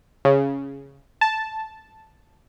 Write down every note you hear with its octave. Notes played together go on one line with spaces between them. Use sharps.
C#3
A5